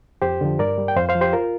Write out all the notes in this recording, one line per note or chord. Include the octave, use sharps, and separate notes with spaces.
F2 G4 C5
D3 F3
G2 A#4 D5
G3
G5
F2 C5 F5
C5 F5
F3
G4 C5
F4 A#4